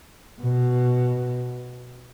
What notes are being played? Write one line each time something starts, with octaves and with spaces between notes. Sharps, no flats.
B2